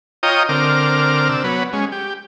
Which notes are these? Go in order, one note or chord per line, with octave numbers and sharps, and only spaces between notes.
F4 C#5 D#5 G5 A#5 D#6
D3 C4 A#4 D6 F6
C3 D4 E6
F#3 B3 B4 C#5
G#3 C#4
G4